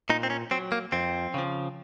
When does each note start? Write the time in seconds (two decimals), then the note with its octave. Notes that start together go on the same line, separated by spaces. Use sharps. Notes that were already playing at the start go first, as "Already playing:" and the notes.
0.10 A#2 D#4
0.23 C4
0.30 C#4
0.51 F#3 C4
0.72 A#3
0.92 F2 C4
1.34 C#3 F3